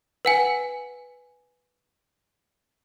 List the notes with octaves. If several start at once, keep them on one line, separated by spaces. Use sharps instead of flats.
B4 F#5 G#5